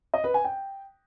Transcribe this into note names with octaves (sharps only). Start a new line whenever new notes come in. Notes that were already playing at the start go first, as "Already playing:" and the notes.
D#5
B4
G#5
G5